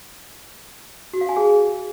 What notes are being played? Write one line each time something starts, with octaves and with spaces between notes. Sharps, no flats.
F#4
F5
G#5
G#4